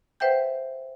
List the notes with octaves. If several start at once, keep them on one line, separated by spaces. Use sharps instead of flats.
B4 C5 E5 F#5 G5 G6